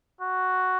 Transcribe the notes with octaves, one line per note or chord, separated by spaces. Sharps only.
F#4